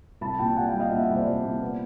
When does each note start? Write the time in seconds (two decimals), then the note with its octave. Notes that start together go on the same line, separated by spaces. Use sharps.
0.21 C2 A5 B5
0.39 A#2 G5 A5
0.57 G3 F#5 G#5
0.68 F5 G5
0.74 G3
0.80 D#5 F5
0.91 A#2 E5 F#5
1.03 E5 F#5
1.09 C2
1.15 C5 D5
1.27 C2
1.45 A#2
1.62 B3